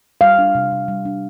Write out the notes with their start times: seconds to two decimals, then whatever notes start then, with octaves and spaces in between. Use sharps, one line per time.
0.21 G3 F5
0.38 D4
0.55 C3
0.72 C3
0.88 G3
1.05 D4